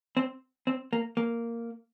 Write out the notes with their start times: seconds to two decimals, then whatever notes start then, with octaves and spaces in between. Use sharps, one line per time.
0.17 C4
0.67 C4
0.93 A#3
1.17 A#3